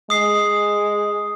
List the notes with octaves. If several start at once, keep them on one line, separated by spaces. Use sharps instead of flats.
G#3 D#6 C7